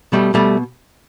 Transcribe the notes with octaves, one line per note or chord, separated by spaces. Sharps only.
B2 G3 A3
B2 G3 A3